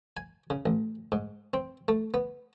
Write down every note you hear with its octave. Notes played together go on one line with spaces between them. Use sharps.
G#5
C#3
A1
G#2
C4
A3
B3